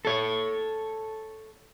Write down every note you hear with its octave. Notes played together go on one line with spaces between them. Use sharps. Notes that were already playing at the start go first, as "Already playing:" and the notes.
A4 C#5